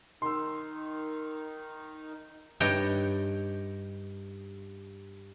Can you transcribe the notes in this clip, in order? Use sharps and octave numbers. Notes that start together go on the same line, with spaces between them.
D#3 D#4 C6 E6
G2 D#4 C#5 D#5 G5